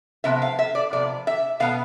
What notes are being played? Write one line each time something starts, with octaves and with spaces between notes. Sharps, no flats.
C3 F3 B3 E5
F5
E5
D5
C3 F3 B3 D5
E5
B2 B3 F5